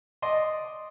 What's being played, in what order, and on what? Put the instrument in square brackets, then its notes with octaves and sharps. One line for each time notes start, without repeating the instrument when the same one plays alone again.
[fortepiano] D5 D#5 C6 D6